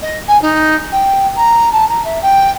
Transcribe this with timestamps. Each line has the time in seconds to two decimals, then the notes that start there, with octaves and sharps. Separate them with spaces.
0.02 D#5
0.28 G#5
0.42 D#4
0.92 G5
1.36 A#5
1.72 A5
1.89 A#5
2.04 E5
2.22 G5